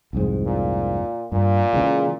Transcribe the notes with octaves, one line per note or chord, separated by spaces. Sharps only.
C2 F2 G#2
A#2
G2 A#2
C#3 E3 G#3